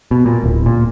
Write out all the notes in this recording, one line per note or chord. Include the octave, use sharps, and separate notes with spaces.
B2
A#2
D1
A#2